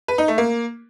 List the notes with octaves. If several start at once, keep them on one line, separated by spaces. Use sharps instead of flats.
B4
D#4
A3
A#3